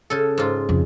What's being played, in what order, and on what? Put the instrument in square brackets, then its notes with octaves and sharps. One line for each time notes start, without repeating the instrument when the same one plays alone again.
[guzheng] C#3 A4
G#2 F4
[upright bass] F2 C#3